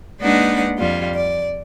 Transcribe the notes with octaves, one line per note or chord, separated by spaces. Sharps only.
G#3 A#3 D4 D#4 B4 F#5
F2 G3 F4
D5